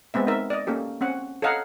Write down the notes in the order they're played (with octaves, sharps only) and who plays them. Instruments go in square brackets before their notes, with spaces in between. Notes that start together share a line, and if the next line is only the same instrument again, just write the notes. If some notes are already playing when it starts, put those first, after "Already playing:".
[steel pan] G#3 B3 C4 E5
C4 D#4 A#4 E5
D5 D#5
A#3 C#4 G4 A4
C4 C#4 F#5
A4 C#5 D#5 F5 F#5 A#5